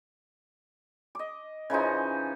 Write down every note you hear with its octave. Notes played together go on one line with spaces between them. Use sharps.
D#5 D6
C#3 E3 F3 D#4